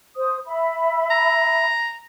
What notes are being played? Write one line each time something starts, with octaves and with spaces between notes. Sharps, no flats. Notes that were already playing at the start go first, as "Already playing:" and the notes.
C5 D#6
E5 B5
A#5